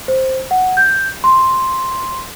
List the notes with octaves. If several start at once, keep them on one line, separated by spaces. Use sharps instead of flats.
C5
F#5
G6
C6